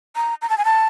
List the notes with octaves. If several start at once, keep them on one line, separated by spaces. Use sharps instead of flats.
A#5
A#5
A5
G#5
A5